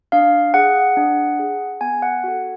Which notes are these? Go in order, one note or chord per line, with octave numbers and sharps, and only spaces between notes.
D4 F5
G#4 F#5
D4
G#4
B3 G#5
F#5
F#4 A4